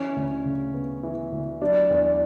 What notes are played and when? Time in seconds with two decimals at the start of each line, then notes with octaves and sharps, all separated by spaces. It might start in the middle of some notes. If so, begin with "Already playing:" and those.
Already playing: E3 C#4
0.16 D2
0.45 C#3
0.74 B3
1.03 E3
1.32 D2
1.61 F#3 D4
1.90 E2